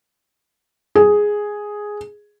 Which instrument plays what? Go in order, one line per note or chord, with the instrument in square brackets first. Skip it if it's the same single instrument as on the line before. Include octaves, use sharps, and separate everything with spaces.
[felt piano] G#4